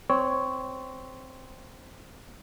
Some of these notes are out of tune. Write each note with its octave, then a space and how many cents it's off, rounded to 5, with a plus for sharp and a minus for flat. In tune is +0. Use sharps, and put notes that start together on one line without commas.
C4 -10 C#5 +0